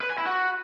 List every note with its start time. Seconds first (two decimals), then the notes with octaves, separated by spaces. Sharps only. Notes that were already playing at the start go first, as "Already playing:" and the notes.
0.01 B4
0.09 G#5
0.18 E4
0.26 F#4